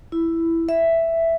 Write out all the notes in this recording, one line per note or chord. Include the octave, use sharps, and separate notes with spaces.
E4
E5